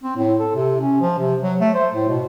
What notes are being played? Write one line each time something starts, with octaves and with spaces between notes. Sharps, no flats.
C4
A2
A4
C3
C#4
F3
C3
F#3
A3
C5
A2
B2